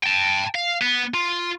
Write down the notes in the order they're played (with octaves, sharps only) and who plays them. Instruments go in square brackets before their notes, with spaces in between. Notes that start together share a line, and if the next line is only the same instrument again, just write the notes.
[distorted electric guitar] G5 A5
F5
B3
F4